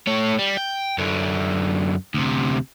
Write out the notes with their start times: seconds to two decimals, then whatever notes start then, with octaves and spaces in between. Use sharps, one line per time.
0.07 A3 C#5
0.39 G3
0.57 G5
0.98 F#2 D3
2.14 D2 C3